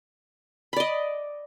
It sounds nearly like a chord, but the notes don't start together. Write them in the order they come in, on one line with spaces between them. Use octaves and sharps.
B5 D5 D#5